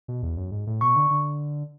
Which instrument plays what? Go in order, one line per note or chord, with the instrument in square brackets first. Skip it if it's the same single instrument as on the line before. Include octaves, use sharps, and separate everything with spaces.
[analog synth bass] B2
E2
F#2
G#2
A2
[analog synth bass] B2 [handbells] C#6
[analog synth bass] D3
D3